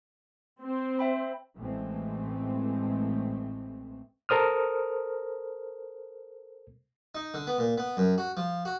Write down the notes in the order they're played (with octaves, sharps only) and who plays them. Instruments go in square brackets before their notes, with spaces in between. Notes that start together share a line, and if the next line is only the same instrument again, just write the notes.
[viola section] C4 C5
[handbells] E5 G5 B5
[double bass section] A1 A2 E3 G#3 A3 C4
[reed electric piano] A4 A#4 C5 D#6 F6
[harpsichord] D#4
D3
B3
A#2
B3
F#2
F#4
F3
F#4